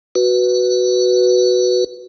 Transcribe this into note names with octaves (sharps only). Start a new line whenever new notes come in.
F#4 B4